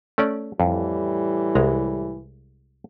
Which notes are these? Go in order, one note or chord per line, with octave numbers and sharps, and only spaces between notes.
A3 C#4 D5
F2 A2 E3 G3
C2 G#3 A#5